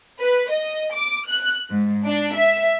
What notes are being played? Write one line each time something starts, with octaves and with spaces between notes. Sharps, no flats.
B4
D#5
D6
F#6
G#2
D4
E5